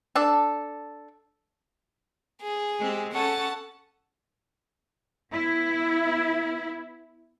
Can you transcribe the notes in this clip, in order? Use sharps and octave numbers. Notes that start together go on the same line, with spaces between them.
D4 A4
G#4
G#3 C4 G4
C#4 A4 C#5 F#5 A5
B3 E4